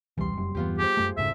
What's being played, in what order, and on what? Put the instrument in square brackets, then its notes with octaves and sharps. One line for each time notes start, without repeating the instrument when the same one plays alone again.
[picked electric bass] E1 C2 E3 [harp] G3 C6
[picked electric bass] F1 F#2
[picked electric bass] E2 G2 E3 [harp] B3 F4 G4
[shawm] G4 [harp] G#4 C5
[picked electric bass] F#2 A3
[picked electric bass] F1 G#2 C#3 [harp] A4 [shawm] E5